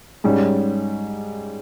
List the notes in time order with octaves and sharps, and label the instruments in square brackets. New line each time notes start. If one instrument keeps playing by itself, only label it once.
[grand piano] G#2 G3 C#4